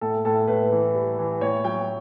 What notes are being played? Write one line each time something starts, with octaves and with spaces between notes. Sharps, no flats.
A2 A4
A2 A4
A2 B4
E3
G3
E3
A2 C#5
F#3 G5